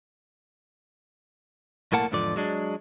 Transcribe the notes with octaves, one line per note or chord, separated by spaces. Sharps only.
B1 A2 A#3 F#5 A5
E2 G#2 D3 F3 D5
F#3 G#3 D4